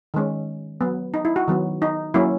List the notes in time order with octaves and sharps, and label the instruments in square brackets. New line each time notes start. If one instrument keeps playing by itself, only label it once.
[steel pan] D#3 G#3 C#4
F#3 B3
D#4
E4
F#4
D#3 F#3 B3
D#4
F#3 A#3 C#4 E4